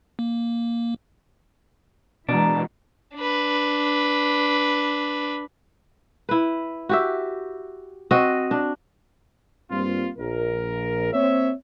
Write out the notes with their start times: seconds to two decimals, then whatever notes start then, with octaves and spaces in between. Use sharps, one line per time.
0.19 A#3
2.29 B2 E3 G#3 D4 A#4 A#5
3.16 D4 B4
6.29 E4 B4
6.89 F#4 G4 E5
8.11 C4 F#4 D#5 F#5
8.51 D4
9.71 G2 G3 A#3 C4 F4
10.18 A#1 A#4
11.13 A#3 C4 C#5 E5